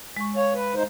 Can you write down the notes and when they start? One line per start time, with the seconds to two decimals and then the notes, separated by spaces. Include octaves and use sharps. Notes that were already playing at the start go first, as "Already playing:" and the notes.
0.17 G#3 C#6
0.36 C#5 F5
0.54 B4
0.75 D#4 C5